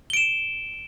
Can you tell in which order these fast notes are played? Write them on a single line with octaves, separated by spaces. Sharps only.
G7 D7 E7